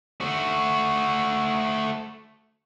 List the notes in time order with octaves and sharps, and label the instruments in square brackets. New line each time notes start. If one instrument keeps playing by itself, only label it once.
[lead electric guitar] A3 F#4